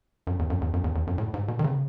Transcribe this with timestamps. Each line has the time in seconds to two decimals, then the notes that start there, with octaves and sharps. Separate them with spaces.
0.27 F#2
0.39 E2
0.50 F#2
0.61 E2
0.73 F#2
0.84 E2
0.95 E2
1.07 F#2
1.18 A2
1.34 G#2
1.48 B2
1.59 D#3
1.64 C#3